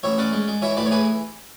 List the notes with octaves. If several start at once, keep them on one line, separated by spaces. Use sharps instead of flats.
A1 C#5 E5
C#4 D5 F#5
G#3
G#3
E3 C#5 E5
A2 B4 D5
C#5
E3 G#4 B4